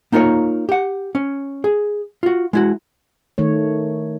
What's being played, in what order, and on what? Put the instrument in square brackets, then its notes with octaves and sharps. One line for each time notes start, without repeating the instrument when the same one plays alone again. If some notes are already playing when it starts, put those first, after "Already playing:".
[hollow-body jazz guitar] A#3 D#4 F4 A#4 C#5
G4 F#5
C#4
G#4
F4 F#4
G#3 E4 F#4
[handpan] D#3 A3 C#5